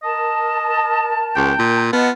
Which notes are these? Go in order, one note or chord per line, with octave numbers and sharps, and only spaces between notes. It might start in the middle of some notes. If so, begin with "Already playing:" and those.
A#4 D#5 A5
C#2 G5
A#2
B3 F4 D#5 F#5 A5